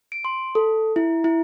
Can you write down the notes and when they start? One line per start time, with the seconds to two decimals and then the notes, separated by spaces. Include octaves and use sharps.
0.12 D7
0.25 C6
0.55 A4
0.96 E4
1.24 E4